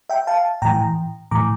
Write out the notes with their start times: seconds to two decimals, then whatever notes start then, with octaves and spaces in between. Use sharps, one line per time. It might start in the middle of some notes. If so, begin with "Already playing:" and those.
0.09 E5 G5
0.27 F5 A5
0.62 A2 E3 G5 A#5
1.31 A2 E3 A#5 D6